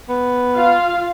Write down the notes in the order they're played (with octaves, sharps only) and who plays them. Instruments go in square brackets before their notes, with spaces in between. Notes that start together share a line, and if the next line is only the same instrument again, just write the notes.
[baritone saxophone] B3
[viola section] F4 F5